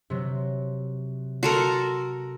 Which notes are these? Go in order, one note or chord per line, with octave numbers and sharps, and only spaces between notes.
C3 F#3
F#4 A4 A#4 C6